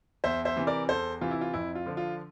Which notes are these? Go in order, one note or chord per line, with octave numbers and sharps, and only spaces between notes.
E2 C5 E5
C5 E5
C3 E3
A#4 D5
E2 A4 C5
C3 E3 F4
E4
F4
F2 E4
F4
D3 F3
F4